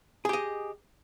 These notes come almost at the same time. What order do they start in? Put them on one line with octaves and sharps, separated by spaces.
G#4 G4 D#5